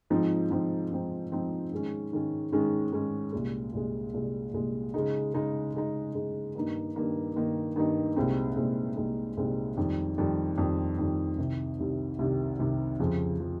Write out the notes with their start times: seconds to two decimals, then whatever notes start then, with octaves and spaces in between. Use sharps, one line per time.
0.10 G#2 F3 C4 D#4
0.50 G#2 F3 C4 D#4
0.91 G#2 F3 C4 D#4
1.31 G#2 F3 C4 D#4
1.72 G#2 D#3 G#3 C#4
2.12 G#2 D#3 G#3 C#4
2.52 G#2 D#3 G#3 C#4
2.92 G#2 D#3 G#3 C#4
3.33 C2 A#2 G#3
3.73 C2 A#2 G#3
4.14 C2 A#2 G#3
4.53 C2 A#2 G#3
4.94 C#3 G#3 D#4
5.34 C#3 G#3 D#4
5.74 C#3 G#3 D#4
6.15 C#3 G#3 D#4
6.55 G2 D#3 A#3 D#4
6.95 G2 D#3 A#3 D#4
7.36 G2 D#3 A#3 D#4
7.76 G2 D#3 A#3 D#4
8.16 C2 A#2 G#3 C4 D#4
8.56 C2 A#2 G#3 C4 D#4
8.97 C2 A#2 G#3 C4 D#4
9.37 C2 A#2 G#3 C4 D#4
9.77 F2 D#3 G3
10.18 F2 D#3 G3
10.58 F2 D#3 G3
10.98 F2 D#3 G3
11.38 C2 C3 D#3
11.79 C2 C3 D#3
12.19 C2 C3 D#3
12.59 C2 C3 D#3
13.00 F2 C#3 F3
13.40 C#3 F3